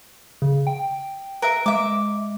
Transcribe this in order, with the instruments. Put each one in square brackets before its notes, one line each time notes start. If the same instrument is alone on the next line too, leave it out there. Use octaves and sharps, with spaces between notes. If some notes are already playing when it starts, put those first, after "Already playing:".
[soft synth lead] C#3
G5
[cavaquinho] A#4 E5 [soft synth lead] B4
[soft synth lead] G#3 [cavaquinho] E5 D6